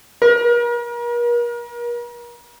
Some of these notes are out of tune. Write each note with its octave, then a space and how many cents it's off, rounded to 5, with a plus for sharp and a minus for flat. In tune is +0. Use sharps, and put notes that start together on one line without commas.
A#4 +40